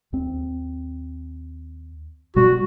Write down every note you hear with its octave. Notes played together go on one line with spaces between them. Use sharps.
D#2 C4
B2 G3 F#4